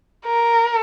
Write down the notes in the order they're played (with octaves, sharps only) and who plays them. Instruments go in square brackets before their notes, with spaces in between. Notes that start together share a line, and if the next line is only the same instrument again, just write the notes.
[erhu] A#4